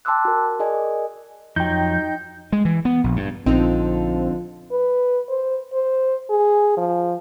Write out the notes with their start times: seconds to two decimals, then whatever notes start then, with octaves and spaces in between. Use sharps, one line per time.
0.05 G5 A5 C6 D6 E6 F#6
0.25 F#4 A#4
0.59 G#4 A#4 D5 D#5 G#5
1.56 F2 F#3 D#4 G5 G6
2.52 G#3
2.65 E3
2.85 B3
3.04 A#1
3.16 G2
3.46 A#1 D3 F3 C4 D#4
4.71 B4
5.29 C5
5.73 C5
6.30 G#4
6.77 F3